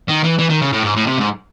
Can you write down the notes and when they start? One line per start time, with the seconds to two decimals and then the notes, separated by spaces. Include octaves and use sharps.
0.08 D#3
0.24 E3
0.39 E3
0.49 D#3
0.61 C#3
0.73 A2
0.84 G#2
0.95 A2
1.07 C3
1.18 G#2